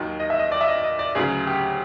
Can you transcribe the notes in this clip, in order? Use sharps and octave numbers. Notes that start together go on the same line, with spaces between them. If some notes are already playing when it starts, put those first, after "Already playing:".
Already playing: D#2 D#3 F#3
D#5
E5
D#5
D5
E5
D#5
D#5
D5
D2 C#3 F#3 G#4
G4